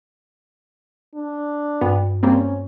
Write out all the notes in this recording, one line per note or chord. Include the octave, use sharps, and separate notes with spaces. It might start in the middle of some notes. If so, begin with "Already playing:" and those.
D4
G2 B3
G3 A#3 C4 C#4